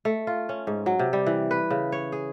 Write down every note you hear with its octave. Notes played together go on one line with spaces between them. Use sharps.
A3
F4
C#4
G#2
F#3
C3
G3
E3
B4
C#3
C#5
G#4